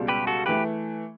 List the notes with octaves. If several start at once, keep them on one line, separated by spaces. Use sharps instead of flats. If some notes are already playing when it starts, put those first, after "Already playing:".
Already playing: C#2 B2 G3
G4 B4
F#4 A4
E3 A3 G4 B4